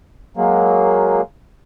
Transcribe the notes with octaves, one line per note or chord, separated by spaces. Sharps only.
F#3 G#3 A#3